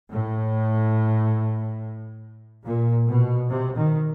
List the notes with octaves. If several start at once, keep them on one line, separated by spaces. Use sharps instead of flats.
A2
A#2
B2
C3
D#3